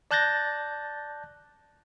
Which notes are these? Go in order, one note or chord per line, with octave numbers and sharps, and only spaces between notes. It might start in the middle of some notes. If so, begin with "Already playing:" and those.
D5 A5 F#6 G6 A6 A#6